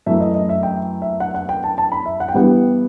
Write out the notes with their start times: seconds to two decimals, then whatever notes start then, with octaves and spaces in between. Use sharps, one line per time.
0.06 F#2 E3 A3 E5
0.21 D#5
0.35 D#5
0.49 E5
0.63 G5
1.02 E5
1.20 F#5
1.35 F#5
1.49 G5
1.64 A5
1.78 A5
1.92 B5
2.06 E5
2.20 F#5
2.28 G5
2.34 G2 E3 G3 B3 F#5